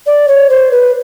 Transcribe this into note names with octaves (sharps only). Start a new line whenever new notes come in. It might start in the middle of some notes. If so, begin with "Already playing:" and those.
D5
C#5
C5
B4